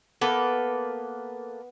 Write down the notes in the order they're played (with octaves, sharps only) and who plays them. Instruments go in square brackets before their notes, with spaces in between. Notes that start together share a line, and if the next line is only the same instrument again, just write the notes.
[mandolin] A#3 A4 B4 [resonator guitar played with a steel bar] B3